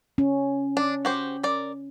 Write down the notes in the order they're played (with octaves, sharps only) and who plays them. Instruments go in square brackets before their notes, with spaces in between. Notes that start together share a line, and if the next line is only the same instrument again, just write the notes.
[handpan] C#4
[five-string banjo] D4
F#4 G4 C5
A#4 D5